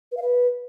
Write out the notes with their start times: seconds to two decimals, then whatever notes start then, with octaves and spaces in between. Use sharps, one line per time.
0.11 B4
0.16 F5
0.22 B4